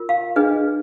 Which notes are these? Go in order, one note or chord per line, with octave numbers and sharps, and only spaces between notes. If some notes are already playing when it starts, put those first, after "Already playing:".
Already playing: F4 A#4
F5
D4 G#4 B4 D#5